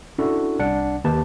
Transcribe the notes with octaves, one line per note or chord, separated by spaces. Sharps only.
C#4 D4 E4 F#4 A4
C2 D4 F#5 C#7
D#2 A#3 G4 B4 A5